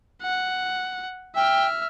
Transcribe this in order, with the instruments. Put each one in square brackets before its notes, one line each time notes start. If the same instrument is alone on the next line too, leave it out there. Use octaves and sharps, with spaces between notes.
[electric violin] F#5
[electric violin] E5 F6 [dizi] G5